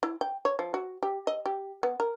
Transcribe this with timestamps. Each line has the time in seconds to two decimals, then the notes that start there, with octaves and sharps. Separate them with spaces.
0.03 E4
0.21 G5
0.45 C#5
0.59 F3
0.74 F#4
1.03 G4
1.27 D#5
1.46 G4
1.83 B3
2.00 A#4